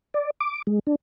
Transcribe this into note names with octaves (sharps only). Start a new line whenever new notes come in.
D5
D6
G#3
D4